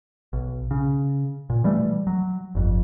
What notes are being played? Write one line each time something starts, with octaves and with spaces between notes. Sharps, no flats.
B1
C#3
A#2
E3 G3 A3
F#3
G1 F2